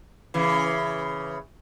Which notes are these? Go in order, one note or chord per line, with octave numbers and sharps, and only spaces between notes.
C#3 E3